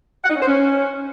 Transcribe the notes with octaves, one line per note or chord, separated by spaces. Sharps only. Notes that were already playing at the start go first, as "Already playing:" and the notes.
F#5
D#4
C#4
C5
C#4